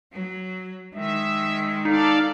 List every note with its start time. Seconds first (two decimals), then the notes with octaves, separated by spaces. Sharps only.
0.12 F#3
0.95 D#3 G#3 E5
1.85 D#4 A4 D5 F5